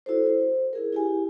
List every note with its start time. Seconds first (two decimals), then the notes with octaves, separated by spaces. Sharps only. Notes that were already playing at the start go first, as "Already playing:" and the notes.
0.06 E4 F#4 A4 C5
0.26 C5
0.73 E4 G#4 A#4
0.93 E4 G4 G#5